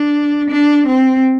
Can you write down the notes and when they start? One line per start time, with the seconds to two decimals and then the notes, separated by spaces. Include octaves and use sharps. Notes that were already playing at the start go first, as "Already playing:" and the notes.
Already playing: D4
0.50 D4
0.87 C4